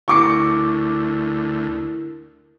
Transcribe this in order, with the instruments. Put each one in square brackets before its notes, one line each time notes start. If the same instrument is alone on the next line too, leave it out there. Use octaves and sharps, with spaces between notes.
[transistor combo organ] D2 [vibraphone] E4 A#4 [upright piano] C#6 D6 C#7